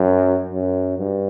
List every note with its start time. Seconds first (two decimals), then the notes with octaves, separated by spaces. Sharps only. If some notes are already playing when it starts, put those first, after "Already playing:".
Already playing: F#2
0.50 F#2
0.98 G2